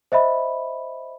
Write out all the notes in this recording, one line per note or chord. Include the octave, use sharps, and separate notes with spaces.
C5 D#5 E5 B5